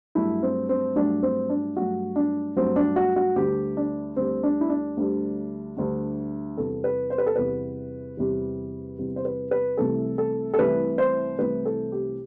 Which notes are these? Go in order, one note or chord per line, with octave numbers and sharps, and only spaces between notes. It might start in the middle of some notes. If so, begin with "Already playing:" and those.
G2 F#3 A3 E4
C4
C4
G2 F#3 A3 D4
C4
D4
G2 F#3 A3 F#4
D4
G2 F#3 A3 C4
D4
F#4
F#4
D2 D3 G3 G4
D4
D2 D3 G3 C4
D4
E4
D4
D2 D3 G3
D2 D3 G3
E2 C3 G3 A4
B4
C5
B4
A4
E2 C3 G3 B4
E2 C3 G3
E2 C3 G3
C5
B4
B4
C2 C3 E3 A3 A4
A4
A4
C2 C3 E3 A3 B4
C5
C2 C3 E3 A3 B4
A4
G4